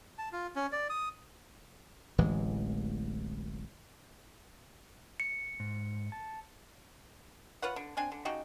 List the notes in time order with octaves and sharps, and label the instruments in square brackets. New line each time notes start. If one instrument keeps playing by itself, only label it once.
[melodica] A5
F4
C#4
D5
D#6
[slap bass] D1 A1 E3 G#3
[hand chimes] C#7
[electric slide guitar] G#2
A5
[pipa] F4 B4 C#5 F#5
D3
C4 D4 G#5
D3
C#3 D#4 F#4 G4